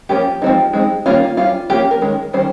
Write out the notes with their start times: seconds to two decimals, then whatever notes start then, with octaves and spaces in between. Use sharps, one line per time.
0.09 F3 A#3 C#4 G4
0.42 F3 G#3 C4 D#4
0.73 G#3 C4 D#4
1.06 D#3 G3 A#3 C#4 F4
1.37 G3 C#4 F4
1.70 F3 A#3 C#4 G4
1.91 A#4
2.01 D#3 G#3 C#4
2.33 D#3 G3 C#4 C5